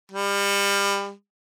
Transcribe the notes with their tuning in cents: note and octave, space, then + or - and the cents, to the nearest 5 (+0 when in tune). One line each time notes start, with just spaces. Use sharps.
G3 +30